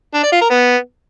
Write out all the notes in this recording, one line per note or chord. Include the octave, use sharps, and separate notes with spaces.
D4
D5
F4
A#4
B3